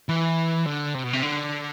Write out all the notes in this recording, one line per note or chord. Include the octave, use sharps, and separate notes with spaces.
E3
D3
C3
B2
C3
D3